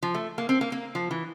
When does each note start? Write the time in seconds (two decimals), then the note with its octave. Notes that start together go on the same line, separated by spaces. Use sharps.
0.03 F3
0.14 A3
0.38 A#3
0.49 C4
0.61 A#3
0.72 A#3
0.95 F3
1.11 E3